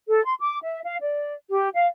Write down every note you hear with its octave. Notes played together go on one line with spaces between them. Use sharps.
A4
C6
D6
E5
F5
D5
G4
F5